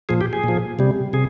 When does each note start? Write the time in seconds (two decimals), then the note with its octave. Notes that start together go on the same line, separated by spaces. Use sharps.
0.09 A#2 F3 G#4
0.21 G4
0.33 G#4
0.44 A#2 F3
0.79 C3 G3
1.13 C3 G#4